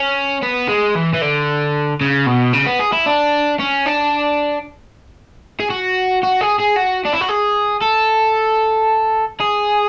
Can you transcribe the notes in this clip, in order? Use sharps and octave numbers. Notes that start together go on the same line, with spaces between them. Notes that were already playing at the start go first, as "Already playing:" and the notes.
Already playing: C#4
B3
G#3
E3
E3
D3
C#3
B2
C#3
B3
G#4
E4
D4
C#4
D4
G#4
F#4
F#4
G#4
G#4
F#4
D4
E4
F#4
G#4
A4
G#4